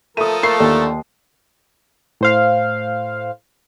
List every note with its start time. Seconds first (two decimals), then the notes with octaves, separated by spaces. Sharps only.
0.17 F3 A3 A4 A#4 D#6 D#7
0.43 A3 A#3 C7
0.60 D#2 D3
2.21 A2 C5 F5